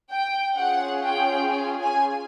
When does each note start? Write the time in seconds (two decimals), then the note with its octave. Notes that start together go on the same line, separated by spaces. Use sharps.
0.10 G5
0.57 C#4 F4 G#4 F#5
1.04 G5
1.51 G#5
1.81 G#5